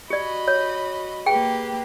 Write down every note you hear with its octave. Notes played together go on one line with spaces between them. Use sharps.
F#4 G4 D5 D#5 B5
C#5
A#3 G4 G#4 B4 G5